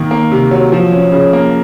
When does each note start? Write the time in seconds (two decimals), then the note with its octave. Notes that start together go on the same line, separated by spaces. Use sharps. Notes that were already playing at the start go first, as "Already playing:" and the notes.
Already playing: D#3 A#3
0.11 A#3
0.32 C3
0.51 F#3
0.72 F3
0.92 C#4
1.12 C#3
1.33 A#3